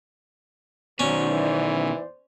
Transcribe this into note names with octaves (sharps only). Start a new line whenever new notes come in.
B2 D#3 F#3 C#4 C5 D5
E3